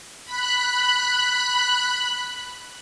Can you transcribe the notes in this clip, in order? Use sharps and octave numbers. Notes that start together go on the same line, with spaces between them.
B5 F#6